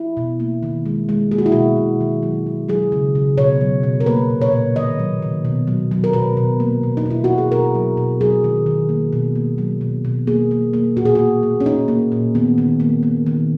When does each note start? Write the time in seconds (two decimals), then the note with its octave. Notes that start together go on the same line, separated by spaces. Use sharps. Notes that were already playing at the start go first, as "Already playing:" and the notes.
Already playing: E4
0.17 B2
0.40 A#3
0.63 D#3
0.86 G#3
1.09 G#3
1.31 A#3 G#4
1.38 F#4
1.46 E4
1.52 B2 F#4
1.77 B2
2.01 D#3
2.23 F#3
2.47 F#3
2.68 F#3 G#4
2.92 C#3
3.15 C#3
3.38 B2 C#5
3.61 F#3
3.83 B2
4.00 A#4
4.06 A#3 B4
4.30 A#2
4.41 C#5
4.52 A#2
4.76 D#3 D#5
4.99 F#3
5.22 D#3
5.45 B2
5.67 F#3
5.91 F#3
6.04 A#4
6.13 B2 B4
6.37 B2
6.60 A#3
6.83 B2
6.97 D#4
7.06 B2 E4
7.24 F#4
7.29 B2
7.38 G#4
7.52 B2 A#4
7.75 F#3
7.97 B2
8.21 F#3 G#4
8.44 D#3
8.66 D#3
8.89 A#3
9.13 B2
9.35 A#3
9.58 F#3
9.81 B2
10.05 B2
10.27 A#3 G#4
10.51 A#3
10.73 A#3
10.97 A#2 F#4
11.05 G#4
11.15 A#3 F#4
11.43 A#3
11.60 C#4
11.65 A#3 D#4
11.88 A#3
12.12 A#2
12.35 D#3 B3
12.58 D#3
12.80 A#3
13.03 A#3
13.26 D#3